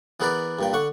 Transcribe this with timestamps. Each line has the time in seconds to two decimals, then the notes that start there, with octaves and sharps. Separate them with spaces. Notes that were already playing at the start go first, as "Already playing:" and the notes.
0.20 E3 B3 G#4 A#4 B4 D5
0.59 G2 A#2 G5
0.73 D3 F#5 C#6